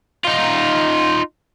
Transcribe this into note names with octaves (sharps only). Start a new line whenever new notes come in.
D#4 F4